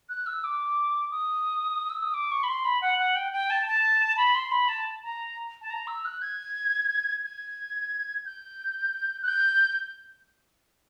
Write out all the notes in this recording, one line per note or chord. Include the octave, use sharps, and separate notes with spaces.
F#6
E6
D6
D#6
E6
D#6
D6
C#6
B5
C6
B5
F#5
F#5
G5
G5
A5
A5
B5
C6
B5
A5
A#5
A5
A#5
E6
F#6
G#6
G#6
G6
F#6
G6